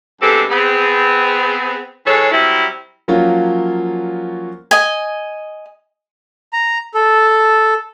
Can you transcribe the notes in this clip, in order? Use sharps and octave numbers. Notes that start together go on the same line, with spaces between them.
G2 G#3 B3 C4 G4 A4
B3 C4 G#4
E3 G#3 G#4 A4 C#5
F#3 G3 C4 E4
F3 F#3 A#3 C#4 F4
D#5 G#5
A#5
A4